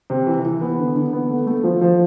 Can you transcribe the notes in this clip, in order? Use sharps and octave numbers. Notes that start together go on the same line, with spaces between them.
C3
E3
E3
B3
D3
D3
B3
A3
A3
F3
F3